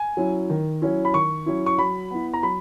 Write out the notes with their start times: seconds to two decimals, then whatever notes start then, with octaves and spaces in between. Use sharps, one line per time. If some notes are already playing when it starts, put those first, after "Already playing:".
Already playing: G#5
0.17 F#3 C#4 E4
0.50 D#3
0.82 F#3 C#4 E4
1.05 B5
1.14 D#3 C#6
1.46 F#3 C#4 E4
1.66 C#6
1.78 F#3 B5
2.11 B3 E4
2.34 A#5
2.43 F#3 B5